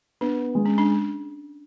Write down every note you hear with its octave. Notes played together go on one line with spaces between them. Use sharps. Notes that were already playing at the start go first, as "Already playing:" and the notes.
B3 D4
G#3
C#4
D4